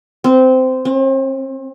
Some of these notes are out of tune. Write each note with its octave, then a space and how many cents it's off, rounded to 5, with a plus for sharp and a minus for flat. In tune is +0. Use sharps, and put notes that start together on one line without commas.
C4 -15
C4 +40